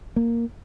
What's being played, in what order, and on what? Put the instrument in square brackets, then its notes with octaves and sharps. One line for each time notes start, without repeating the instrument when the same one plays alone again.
[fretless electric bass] A#3